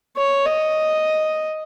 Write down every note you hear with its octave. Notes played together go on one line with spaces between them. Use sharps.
C#5
D#5